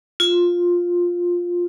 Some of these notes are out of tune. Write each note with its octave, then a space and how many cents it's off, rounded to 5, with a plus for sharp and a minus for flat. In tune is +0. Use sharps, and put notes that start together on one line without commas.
F4 +10